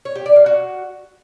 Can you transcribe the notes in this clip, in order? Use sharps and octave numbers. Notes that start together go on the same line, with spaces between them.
C#5
G4
D5
F5
F#4